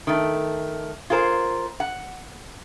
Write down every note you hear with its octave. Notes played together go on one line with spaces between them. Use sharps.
D#3 A3
F4 G#4 A#4 C5
F#5